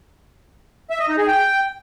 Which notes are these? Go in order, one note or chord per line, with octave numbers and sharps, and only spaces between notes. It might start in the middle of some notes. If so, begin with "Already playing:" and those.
E5
D#5
D#4
G#4
G5